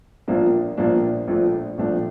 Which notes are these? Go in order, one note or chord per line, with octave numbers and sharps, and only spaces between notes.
A#1 A#2 F3 A#3 D4
A#1 A#2 F3 A#3 D4
A#1 A#2 F3 A3 D4
A#1 A#2 F3 A3 D4